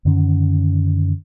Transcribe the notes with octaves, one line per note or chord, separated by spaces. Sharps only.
F#2 D3 D#3 C#4